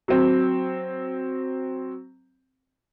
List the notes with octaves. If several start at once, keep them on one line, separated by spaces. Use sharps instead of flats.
F#3 C4